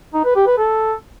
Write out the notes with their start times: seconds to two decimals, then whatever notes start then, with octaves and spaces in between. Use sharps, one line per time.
0.14 D#4
0.25 B4
0.36 G4
0.47 B4
0.58 A4